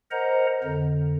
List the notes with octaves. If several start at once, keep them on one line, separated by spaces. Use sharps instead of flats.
A#4 C5 D#5 F#5 A#5
F2 D3